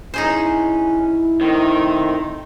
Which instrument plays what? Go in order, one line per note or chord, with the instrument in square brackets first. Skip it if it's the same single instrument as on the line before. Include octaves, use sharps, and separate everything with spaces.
[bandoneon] C#4 [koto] D#4 G#4 C5 [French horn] E4
[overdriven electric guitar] D#3 [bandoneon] A3 C4